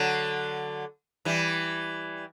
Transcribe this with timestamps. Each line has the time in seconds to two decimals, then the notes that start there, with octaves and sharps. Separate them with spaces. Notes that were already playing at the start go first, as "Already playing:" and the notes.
Already playing: D3 F#3
1.25 E3 G3